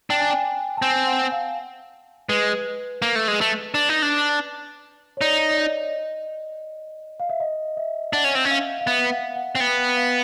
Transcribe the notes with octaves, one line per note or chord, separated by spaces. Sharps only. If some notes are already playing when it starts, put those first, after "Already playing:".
D4 G5
G#5
G5
A5
C4 G#5
F#5
F5
G#3 B4
A#3
A3
G#3
A3
D4
D#4
D4
C#5
D#4 D5
D5
D#5
F5
E5
D#5
E5
D4 F#5
C#4
C4
C#4
F5
F5
B3 E5
F#5
F5
F#5
C4
B3 G5
F#5
F5